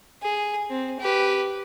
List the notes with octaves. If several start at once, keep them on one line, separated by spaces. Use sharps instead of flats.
G#4
C4
G4 B4